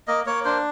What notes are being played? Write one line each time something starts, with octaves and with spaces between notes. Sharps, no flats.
A#3 D#5
A#3 C#5
D4 C5